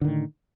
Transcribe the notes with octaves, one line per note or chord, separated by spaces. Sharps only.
A2 D3 D#3